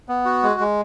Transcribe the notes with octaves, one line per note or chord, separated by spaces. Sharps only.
B3
F#4
G#3
G#3